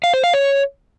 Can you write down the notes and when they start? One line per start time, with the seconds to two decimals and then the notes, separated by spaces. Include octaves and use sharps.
0.04 F5
0.14 C5
0.24 F5
0.34 C#5